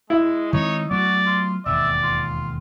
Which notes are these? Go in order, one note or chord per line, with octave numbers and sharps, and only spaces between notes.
G#3 E4
D#3 G#3 C4 D#4 C#5
F#3 A3 B3 F#4 D5
F4
E1 D#2 G#2 D5 E5
F4